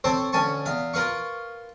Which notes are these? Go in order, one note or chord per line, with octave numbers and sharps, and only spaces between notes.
C4 A4 C5 C#5
D2 C#4 G#5 A5 C#6
E2 F5
F4 A#4 B4 F5 C#6